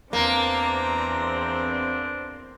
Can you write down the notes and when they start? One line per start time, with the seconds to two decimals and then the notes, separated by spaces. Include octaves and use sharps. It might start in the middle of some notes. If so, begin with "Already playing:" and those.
0.13 E2 A#3 C4 D4 A#5